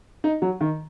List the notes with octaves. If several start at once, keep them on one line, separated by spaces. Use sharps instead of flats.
D#4
F#3
D#3